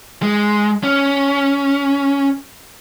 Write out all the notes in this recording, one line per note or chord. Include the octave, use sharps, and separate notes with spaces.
G#3
C#4